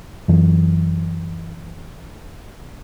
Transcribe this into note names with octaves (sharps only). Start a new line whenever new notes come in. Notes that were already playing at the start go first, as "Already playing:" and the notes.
F#2 E3